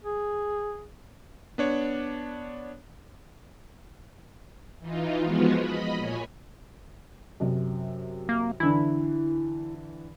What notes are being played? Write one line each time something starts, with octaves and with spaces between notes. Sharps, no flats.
G#4
B3 D4 C#5
E3 D#4 F4
F3 G#3 B3 F4 F#4
D#5 B5
A#2 C#5 G#5
F#2 C3
A#3
D3 E3 E4